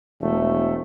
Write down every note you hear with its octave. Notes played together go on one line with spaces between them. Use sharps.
E1 A3